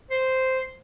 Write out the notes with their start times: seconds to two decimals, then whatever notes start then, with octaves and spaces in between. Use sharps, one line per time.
0.11 C5